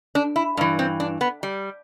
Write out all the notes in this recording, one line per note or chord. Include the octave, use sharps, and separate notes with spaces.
D4
E4
G2 E3
C4
D4
B3
G3